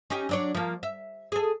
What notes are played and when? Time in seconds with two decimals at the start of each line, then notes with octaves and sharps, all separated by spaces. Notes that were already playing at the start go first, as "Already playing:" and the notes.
0.10 C#4 D#4 G4
0.29 F#3 D4 C#5
0.54 F3 A#3
0.83 E5
1.32 G#4 A4